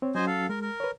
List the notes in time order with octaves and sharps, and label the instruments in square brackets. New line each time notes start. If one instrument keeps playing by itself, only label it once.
[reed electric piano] C4 C#5
[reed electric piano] F#3 C#4 F#4 [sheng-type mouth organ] C5 D#5 G#5
[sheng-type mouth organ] A4 F5
[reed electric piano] G#3 [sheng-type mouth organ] A#4
[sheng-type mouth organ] A#4
[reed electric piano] B4 C#5